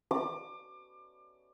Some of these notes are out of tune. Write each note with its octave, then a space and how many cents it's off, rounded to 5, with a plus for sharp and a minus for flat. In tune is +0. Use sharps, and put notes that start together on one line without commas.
D6 +30